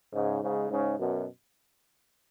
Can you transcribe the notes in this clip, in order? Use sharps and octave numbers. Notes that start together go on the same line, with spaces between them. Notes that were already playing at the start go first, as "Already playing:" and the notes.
G#2 C#3
G#2 C#3
G#2 C#3
F#2 B2